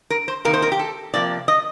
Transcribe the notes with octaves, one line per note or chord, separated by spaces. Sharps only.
A#4
C5
C3 D#3 A#3 A#4
C5
A#4
G4
A4
C3 F3 A#3 D5
D#5